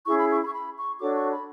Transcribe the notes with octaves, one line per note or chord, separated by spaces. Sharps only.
C#4 E4 G#4 C#6
B5
C#6
B5
C#6
B5
C#6
D4 F#4 A4 C#5 D6
C#6
B5